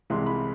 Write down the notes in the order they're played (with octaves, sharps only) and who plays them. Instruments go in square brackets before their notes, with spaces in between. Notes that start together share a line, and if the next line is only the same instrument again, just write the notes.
[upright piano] C2 C3 E3 G#3 C6
B5